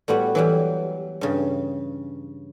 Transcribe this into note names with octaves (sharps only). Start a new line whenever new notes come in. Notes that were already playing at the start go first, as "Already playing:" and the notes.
A2 G3 B3 F#4
E3 F#3 G3
G2 C#3